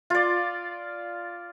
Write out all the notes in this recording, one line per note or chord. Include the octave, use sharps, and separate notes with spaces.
F4 D5